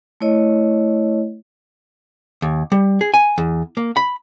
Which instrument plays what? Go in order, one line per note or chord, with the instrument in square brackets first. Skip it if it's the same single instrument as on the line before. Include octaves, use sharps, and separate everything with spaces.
[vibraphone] A3 E4 C#5 D#5
[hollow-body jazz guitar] D#2
G3
G#4
G#5
E2
A#3
B5